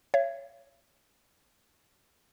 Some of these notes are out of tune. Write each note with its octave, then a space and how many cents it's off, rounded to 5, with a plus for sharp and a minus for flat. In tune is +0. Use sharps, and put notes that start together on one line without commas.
C#5 +0 E5 +45